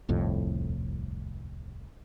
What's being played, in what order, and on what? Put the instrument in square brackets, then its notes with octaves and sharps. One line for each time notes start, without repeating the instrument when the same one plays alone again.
[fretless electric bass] D#1 C2 F2 A2